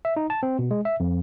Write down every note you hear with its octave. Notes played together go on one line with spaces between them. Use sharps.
E5
D#4
A5
C4
B2
G#3
E5
F2